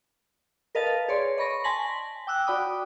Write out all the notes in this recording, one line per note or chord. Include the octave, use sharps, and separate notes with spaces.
A#4 B4 D#5 F5 A5 A6
G#4 C#5 D5 C6
D5 D#5 B5 C#6 A#6
G#5 A5 C6 A#6 B6 F#7
G5 D6 E6 F#6
F#4 D5 G5 B5 D6 D#6